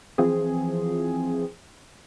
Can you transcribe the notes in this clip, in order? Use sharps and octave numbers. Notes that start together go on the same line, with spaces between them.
E3 F3 C4 G#4